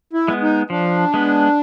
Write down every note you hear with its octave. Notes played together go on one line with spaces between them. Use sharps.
E4
G#3 B3
D#4
F3 D4
G#3 B3